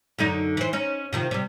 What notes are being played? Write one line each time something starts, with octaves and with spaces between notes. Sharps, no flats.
F#2 D3 D#4
E3 C5
C#4 D#4
C3 D#3 F3
C3 G3